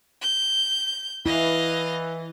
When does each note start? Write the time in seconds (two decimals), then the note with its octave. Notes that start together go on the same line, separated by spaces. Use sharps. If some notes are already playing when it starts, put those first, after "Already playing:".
0.22 G6
1.26 E3 E4 D#5 F5